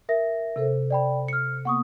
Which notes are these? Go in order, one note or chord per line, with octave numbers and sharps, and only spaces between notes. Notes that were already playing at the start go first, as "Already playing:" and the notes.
A#4 E5 A#6
C3 A4 C5
D5 G5 B5
F6 C#7
A#3 B3 F#5 C#6 D#6